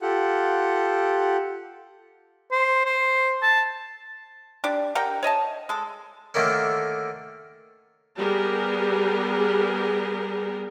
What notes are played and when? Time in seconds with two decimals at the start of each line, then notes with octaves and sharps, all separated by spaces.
0.02 F4 G4 A4 F#5
2.52 C5
2.85 C5
3.43 A5
4.64 D4 G4 D5
4.95 G4 A#4 F#5 G5
5.23 C#5 D#5 E5 A5
5.69 G#3 A4
6.34 D3 D#3 A3 A#3 C#4
8.17 G3 B3 G4 G#4 A#4